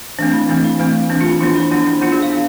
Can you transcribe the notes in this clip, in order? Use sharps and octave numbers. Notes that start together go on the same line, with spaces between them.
E3 A3 C4 D4
E4
E3 A3 C4
E4
E3 A3 C4
E3 A3 C4 D4
F4
E4
F3 B3 D4 F4
E4
F3 B3 D4
E4
F3 B3 D4 F4
G#4
F5
D4